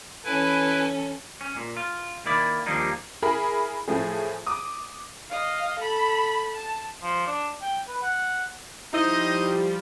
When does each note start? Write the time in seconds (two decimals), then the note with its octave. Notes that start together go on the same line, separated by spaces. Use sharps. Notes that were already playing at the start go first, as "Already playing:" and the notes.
0.24 E3 C#4 E4 A4 B4 G#5
1.41 C#4
1.56 A#2
1.77 F4
2.26 D#3 A#3 E4 D5
2.66 D#2 F3 G3 A#3 D4 D#4
3.22 E4 G#4 A#4 B5
3.88 A2 F3 A3 G#4
4.46 D6 D#6
5.30 D#5 F5
5.79 A4 B5
6.55 A5
7.03 F3
7.27 D4
7.62 G5
7.88 B4
8.02 F#5
8.94 F3 G3 D#4 E4 C5 D#5